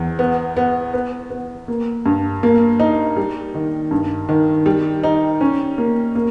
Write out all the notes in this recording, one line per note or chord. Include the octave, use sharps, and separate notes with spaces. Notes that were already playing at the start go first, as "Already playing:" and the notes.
Already playing: E2
B3
B3
B3
B3
A#3
G2
A#3
D#4
G3
D#3
G2
D#3
G3
D#4
C#4
A#3
A#3